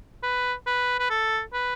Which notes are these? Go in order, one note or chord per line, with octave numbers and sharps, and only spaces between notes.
B4
B4
B4
A4
B4